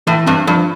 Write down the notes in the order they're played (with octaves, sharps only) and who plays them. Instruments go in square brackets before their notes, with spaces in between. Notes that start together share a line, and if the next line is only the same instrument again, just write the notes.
[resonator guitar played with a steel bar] A2 [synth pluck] E3
[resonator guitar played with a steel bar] G2 [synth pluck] C4
[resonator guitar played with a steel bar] G2 [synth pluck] F3